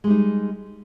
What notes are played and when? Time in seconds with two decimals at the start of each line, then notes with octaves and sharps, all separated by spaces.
0.04 G#3
0.07 G3
0.10 D#4